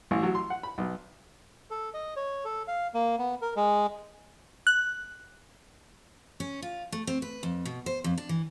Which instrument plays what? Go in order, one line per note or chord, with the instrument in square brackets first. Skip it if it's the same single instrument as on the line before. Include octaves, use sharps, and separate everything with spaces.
[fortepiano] A1
F#3
C6
F#5
B5
B1
[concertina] A4
D#5
C#5
A4
F5
A#3
B3
A#4
G#3
[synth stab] F#6
[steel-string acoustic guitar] C#4
F4
A3
C4
B4
F2
B2
C5
F2
D4
E3